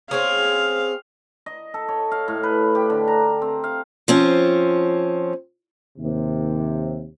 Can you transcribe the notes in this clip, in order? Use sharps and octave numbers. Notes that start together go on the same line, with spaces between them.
C4 C#4 G#4 F5
D#5
A4
C#5
F5
A2
B4
G4
D3
A#5
C4
F5
F3 C4 C#4
D#2 C3